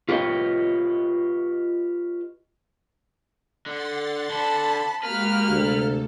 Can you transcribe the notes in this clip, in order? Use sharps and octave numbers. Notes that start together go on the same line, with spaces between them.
F4 G4 B4 C#5 D#5
D3 F#5 C6 A6
D3 A5 B5
G#3 A#3 F#4 G4 B4 F6
D2 C3 A4